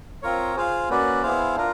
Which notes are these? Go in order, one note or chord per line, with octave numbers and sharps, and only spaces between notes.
C4 F4 A#4 C#5
F4 G#4 C5 F5
A#3 C#4 F#4 B4 D5
B3 E4 G#4 C5 F5
D4 F4 A#4